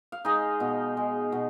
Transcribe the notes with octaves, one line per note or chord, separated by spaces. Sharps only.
F5
G#3 D#4 D#5
B2
G#3
B2